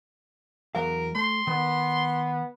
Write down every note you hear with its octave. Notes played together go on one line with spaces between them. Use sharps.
E2 F#3 A#4 F5
A3 C6
D#3 B3